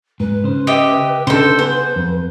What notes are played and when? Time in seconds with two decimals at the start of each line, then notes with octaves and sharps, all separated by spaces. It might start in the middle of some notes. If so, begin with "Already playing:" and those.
0.20 G#2 B4
0.44 C#3 C5
0.67 G4 D#5 E5
1.27 C#3 D4 D#4 A4 C5
1.59 B3 G#4 C5
1.96 F2